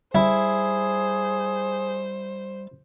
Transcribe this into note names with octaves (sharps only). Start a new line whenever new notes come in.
G3 E4 G#4 C5